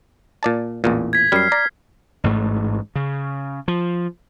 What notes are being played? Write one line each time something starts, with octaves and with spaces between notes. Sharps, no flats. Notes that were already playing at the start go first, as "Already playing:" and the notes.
A#2 D5 A5
A1 E2 A#2
G#6 B6
F#2 G3 F6 C7
D5 A#5
A1 G#2 A3
C#3
F3